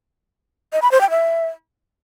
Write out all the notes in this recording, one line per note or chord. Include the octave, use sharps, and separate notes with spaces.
D#5
B5
C5
G5
E5